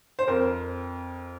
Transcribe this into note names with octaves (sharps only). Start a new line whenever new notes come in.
C5
F2 A#4